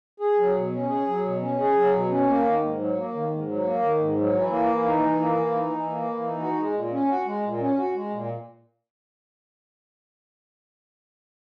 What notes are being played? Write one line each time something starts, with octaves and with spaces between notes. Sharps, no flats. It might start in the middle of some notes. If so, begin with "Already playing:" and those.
G#4
F#3
B2
C#4
G#4
F#3
B2
C#4
G#4
F#3
B2
C#4
A#3
D#3
G#2
F#3
A#3
D#3
G#2
F#3
A#3
D#3
G#2
F#3
E3
A#3
E3
D#4
E3
A#3
E3
D#4
E3
A#3
E3
D#4
F#4
G#3
A#2
C#4
F#4
G#3
A#2
C#4
F#4
G#3
A#2